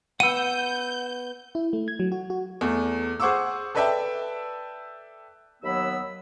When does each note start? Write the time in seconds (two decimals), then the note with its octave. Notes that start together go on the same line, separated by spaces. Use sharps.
0.20 B3 F#5 C#6 E6 G6 D#7
1.55 E4
1.73 A3
1.88 G#6
2.00 F#3
2.12 F#4
2.30 F#4
2.61 E2 A3
3.20 G#4 C5 F#5 C#6 D6 E6
3.75 A4 B4 D5 E5 G5 A5
5.63 D#2 F#3 B3 B5 E6